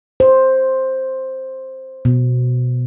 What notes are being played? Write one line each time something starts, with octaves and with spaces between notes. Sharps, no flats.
C5
B2